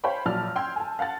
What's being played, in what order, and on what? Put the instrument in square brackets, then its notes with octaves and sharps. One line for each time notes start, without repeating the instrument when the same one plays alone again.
[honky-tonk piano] C5 C#5 F5 G5 B5 C#6
A#1 F#3 D5 A5 F6
G5 C6 E6 G6 G#6
G#5 A5
F5 F#5 A5 A6